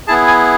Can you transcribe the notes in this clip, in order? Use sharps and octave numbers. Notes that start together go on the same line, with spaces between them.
B3 E4 G#4 A5
G#5